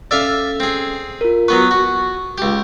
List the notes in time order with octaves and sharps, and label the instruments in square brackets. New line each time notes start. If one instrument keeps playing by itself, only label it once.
[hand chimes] C#4 A4 E6 [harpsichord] D5 E5 F5
[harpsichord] C4 G#4
[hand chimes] F4 A#4
[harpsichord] F#3 B3 B4 [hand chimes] C#6
[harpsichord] F#4
[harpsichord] C#2 G4 [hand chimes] G6